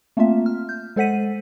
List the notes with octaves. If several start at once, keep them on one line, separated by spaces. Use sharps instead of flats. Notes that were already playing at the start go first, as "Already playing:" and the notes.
A3 A#3 C4 F4 E5
F6
G6
G#3 A4 C5 F#5 B6 D#7